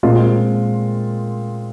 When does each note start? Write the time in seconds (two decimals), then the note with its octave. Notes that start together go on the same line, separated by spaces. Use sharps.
0.03 A#2 G#3 C4 F4